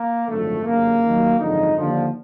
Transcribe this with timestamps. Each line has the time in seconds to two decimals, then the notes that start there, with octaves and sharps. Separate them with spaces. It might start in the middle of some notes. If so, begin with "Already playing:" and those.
Already playing: A#3
0.27 G#1 F#2 D3 F3 A3
0.64 G1 F#2 C#3 A#3
1.02 D#2 D#3 F#3
1.39 G#1 F#2 D3 F3 D#4
1.77 D#2 D3 F3